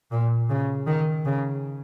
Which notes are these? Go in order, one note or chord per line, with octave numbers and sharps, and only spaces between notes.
A#2
C#3
D#3
C#3